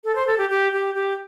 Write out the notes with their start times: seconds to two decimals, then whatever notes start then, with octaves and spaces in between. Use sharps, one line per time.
0.04 A4
0.15 C5
0.27 A4
0.38 G4
0.50 G4
0.72 G4
0.95 G4